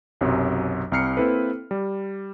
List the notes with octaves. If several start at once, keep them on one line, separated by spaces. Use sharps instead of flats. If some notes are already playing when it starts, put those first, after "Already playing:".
B1 F#2 C3 F#3
C2 C4 A#5 F6 C7 C#7
A#3 C4 E4 A4 B4
G3